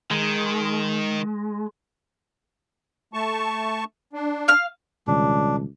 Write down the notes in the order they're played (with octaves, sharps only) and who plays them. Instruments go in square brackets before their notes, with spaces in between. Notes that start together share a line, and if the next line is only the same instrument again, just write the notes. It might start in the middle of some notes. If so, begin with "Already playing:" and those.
[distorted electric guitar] D#3 [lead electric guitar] G#3
[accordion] A3 A5 C#6
D4
[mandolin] F5 F6
[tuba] C#2 [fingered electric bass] B2 D#3 G3 [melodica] D4